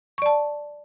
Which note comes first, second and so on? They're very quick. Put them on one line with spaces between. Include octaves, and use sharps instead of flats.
C#6 D5 A5